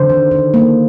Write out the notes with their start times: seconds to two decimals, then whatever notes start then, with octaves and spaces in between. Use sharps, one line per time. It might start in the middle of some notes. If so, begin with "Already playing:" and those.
Already playing: D3 C5
0.10 D#3
0.31 D#3
0.54 A#3